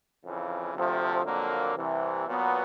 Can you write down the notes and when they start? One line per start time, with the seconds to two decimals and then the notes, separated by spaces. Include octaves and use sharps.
0.24 F2 C#3 E3
0.74 D2 C3 F3 A3
1.25 F2 D3 F#3 A#3
1.76 C2 C3 E3
2.27 A#2 F#3 B3